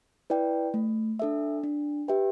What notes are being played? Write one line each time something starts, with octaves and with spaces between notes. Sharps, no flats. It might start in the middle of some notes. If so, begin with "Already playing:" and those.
E4 B4 D5 G5
A3
D4 A4 E5
D4
G4 B4 E5 G5